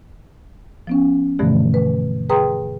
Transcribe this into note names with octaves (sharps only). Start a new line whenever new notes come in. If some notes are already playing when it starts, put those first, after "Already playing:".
F3 B3 C#4
G2 B2 D3 E3 F3 A3
B4
G#4 B4 G5 A#5 C6 D#6